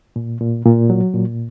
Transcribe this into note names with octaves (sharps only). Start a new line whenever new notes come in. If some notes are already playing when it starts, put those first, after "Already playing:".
A#2
A#2
A#2
F#3
A#2